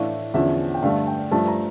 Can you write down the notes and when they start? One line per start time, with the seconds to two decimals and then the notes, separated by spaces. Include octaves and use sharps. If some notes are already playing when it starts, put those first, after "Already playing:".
Already playing: A2 E3 A3 D4 F5
0.34 E2 D3 F3 C#4 E5
0.74 G5
0.82 G2 D3 A3 F5
1.07 G5
1.31 G2 F3 A3 A5
1.48 A#5